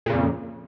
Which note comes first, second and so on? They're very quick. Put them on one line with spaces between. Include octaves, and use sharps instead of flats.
A#2 C#3 F2